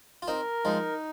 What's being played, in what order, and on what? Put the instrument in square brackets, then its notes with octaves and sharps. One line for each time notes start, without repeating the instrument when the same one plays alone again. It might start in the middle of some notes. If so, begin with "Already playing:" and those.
[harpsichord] F4
[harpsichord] C4 D#4 [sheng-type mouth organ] A#4
[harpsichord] F3 G#3 [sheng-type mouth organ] D#4